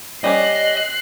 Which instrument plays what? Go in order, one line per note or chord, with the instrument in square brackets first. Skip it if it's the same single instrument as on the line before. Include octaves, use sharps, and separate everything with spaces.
[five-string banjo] G3 C#4 D5 [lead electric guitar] D#5 [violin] F#6 C7